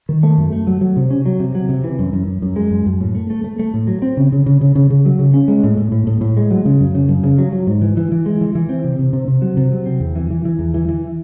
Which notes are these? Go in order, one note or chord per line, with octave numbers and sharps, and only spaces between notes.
D#3
A3
F#2
A3
F#3
F#3
C3
C#4
F#3
C3
F#3
C3
E3
F#2
F#2
F#2
F#2
G#3
F#2
F#2
A2
A3
A3
A3
A3
A2
F#3
C4
C#3
C#3
C#3
C#3
C#3
C#3
F#3
C#3
C#4
G#3
A2
A2
A2
A2
A2
G#3
F#3
C#3
F#2
C#3
F#2
C#3
F#3
F#3
G#2
E3
E3
E3
G#3
E3
E3
C4
C3
C3
C3
C3
F#3
C3
F#3
C4
E2
E3
E3
E3
E2
E3
E3